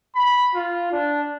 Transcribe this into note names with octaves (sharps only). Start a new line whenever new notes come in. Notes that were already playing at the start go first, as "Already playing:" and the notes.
B5
F4
D4